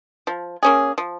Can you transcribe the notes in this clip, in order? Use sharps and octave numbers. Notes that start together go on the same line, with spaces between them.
F3
A#3 C#4 G#4
F3